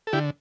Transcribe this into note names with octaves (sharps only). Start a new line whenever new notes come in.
A4
D3 E4 G4